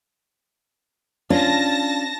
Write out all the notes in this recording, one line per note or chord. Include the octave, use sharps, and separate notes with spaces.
C#4 D4 F4 A5 A#6